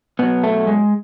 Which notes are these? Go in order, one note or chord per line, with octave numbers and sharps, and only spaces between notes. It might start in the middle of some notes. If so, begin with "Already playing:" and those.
B2 F#3 B3
A3
G#3